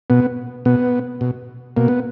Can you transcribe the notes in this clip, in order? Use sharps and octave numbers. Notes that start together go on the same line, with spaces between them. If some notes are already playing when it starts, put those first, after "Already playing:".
B2 B3
B2 B3
B2
B2 A#3
B3